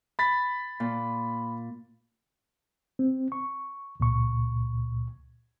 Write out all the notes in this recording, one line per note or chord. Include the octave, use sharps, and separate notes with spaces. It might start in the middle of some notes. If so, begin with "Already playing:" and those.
B5 A6 B6
A#2
C4
C#6
C#2 A#2 C#6